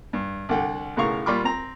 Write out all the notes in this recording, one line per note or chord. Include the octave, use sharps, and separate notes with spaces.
G2
C2 D3 F#5 G5
B1 A2 C#3 A#4 F5 C#6
A#2 G3 F4 B5 C#6 D6
C4 A#5